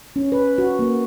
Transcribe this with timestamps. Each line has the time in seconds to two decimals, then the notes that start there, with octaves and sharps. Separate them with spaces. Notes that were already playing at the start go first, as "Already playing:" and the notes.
0.16 C#4
0.32 B4
0.58 F#4
0.79 A#3